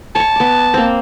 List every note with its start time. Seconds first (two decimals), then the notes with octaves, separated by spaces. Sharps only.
0.15 C#5 A5 C#6
0.36 B3 D6
0.74 A#3 C4